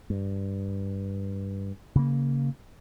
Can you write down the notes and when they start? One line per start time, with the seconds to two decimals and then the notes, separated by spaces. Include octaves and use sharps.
0.10 G2
1.95 C#3 A#3